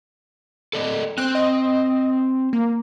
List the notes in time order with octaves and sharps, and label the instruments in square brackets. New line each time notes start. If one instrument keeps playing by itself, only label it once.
[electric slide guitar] A4 D5 D#5
[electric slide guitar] C4 C5 [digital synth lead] F#6
[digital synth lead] D#5
A#3